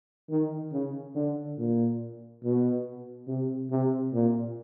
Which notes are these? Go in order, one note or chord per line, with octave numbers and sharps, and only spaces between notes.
D#3
C#3
D3
A#2
B2
C3
C3
A#2